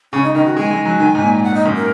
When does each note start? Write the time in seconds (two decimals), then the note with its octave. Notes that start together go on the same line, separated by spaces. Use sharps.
0.13 C#3 C#4
0.24 D#4
0.35 D#3 D#4
0.45 F#4
0.57 G#3 G#5
0.71 G#3
0.85 F#3
1.00 D#3
1.15 G#2
1.22 A#2
1.44 F#5
1.54 D#4
1.65 F#2
1.76 A#4